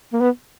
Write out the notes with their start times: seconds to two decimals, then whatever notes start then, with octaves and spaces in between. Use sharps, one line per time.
0.13 A#3
0.21 B3